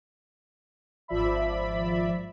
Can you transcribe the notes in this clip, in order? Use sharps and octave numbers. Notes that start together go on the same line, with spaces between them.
G#1 F3 D5 E5 B5